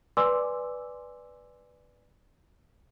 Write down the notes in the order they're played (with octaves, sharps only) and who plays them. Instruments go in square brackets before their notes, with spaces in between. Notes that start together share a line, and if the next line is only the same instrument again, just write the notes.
[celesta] B4 D5 G#5 C6 D6 E6